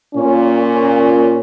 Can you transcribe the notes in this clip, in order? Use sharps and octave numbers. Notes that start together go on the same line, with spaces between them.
A#2 C#4